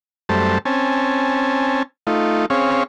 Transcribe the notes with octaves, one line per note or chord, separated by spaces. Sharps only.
F#2 G3 A3 C5 A5
C4 C#4 G#5 A5
A3 D#4 F4
C4 C#4 G#4 C#5 F5